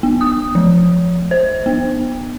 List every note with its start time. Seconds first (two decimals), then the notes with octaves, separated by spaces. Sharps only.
0.03 B3
0.21 D#6
0.55 F3
1.31 C5
1.66 B3